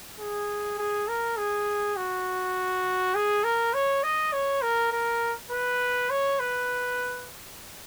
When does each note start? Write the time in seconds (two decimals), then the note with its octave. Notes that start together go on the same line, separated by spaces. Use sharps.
0.19 G#4
0.78 G#4
1.08 A#4
1.37 G#4
1.97 F#4
3.15 G#4
3.44 A#4
3.74 C#5
4.04 D#5
4.33 C#5
4.62 A#4
4.92 A#4
5.51 B4
6.10 C#5
6.40 B4